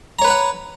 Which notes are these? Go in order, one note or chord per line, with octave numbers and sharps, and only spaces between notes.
B4 C#5 F#5 A#5 B5